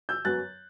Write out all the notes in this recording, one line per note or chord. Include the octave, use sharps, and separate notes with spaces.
E6 G6
F#2 F#3 B3 F#6 A6